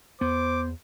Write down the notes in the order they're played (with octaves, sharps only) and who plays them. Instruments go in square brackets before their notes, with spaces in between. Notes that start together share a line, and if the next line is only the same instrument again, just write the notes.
[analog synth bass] E2 [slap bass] B3 [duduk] C5 [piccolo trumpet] D6